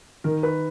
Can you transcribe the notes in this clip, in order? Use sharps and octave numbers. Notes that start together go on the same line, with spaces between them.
D#3 A#4
B4